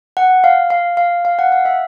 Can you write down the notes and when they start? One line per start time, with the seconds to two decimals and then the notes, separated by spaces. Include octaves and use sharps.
0.17 F#5
0.44 F5
0.70 F5
0.97 F5
1.25 F5
1.39 F#5
1.52 F5
1.65 E5